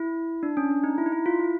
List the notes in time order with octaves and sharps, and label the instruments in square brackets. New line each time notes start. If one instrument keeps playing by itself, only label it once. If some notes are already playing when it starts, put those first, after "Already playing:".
Already playing: [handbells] E4
D4
C#4
D4
D#4
E4
D#4
E4
F4
E4